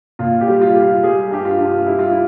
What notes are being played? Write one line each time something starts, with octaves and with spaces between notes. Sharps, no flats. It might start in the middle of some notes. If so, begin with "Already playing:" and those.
A#2 F4
G4
G3
F4
G3
F4
G3 G#4
G2 G4
F4
G2
F4
G3 E4
F4
E4